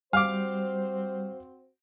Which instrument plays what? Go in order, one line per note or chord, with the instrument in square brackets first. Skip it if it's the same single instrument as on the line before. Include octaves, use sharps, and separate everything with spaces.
[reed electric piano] G3 [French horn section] C4 F#4 C5 [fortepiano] F5 D6